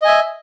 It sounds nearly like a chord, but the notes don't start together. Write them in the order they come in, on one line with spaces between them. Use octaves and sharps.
D#5 G#5 E5